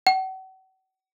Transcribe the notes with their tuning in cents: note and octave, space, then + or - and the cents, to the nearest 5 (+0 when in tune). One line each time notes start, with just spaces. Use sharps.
F#5 +40